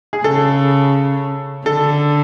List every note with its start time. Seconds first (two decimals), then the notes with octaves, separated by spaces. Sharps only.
0.13 G#4
0.24 C#3 A4
1.66 D3 A4